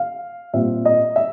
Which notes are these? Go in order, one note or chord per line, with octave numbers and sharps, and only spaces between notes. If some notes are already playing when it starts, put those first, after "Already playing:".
Already playing: F5
A#2 G3 C4 E5
D#5
E5